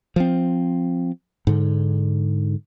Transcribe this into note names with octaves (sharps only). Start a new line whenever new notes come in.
F3 C4
G#2 D3